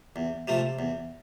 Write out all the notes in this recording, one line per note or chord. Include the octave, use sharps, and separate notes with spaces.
E2
C3 F3 A3
E2